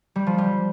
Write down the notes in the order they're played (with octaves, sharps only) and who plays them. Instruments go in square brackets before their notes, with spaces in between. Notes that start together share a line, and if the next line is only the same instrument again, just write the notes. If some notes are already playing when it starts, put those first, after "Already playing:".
[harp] G3
F3
G3